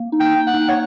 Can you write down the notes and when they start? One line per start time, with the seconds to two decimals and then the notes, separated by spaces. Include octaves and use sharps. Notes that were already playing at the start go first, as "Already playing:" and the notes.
Already playing: A#3
0.12 D#4
0.20 G5
0.34 A#3
0.47 F#5
0.54 D#4
0.69 C#5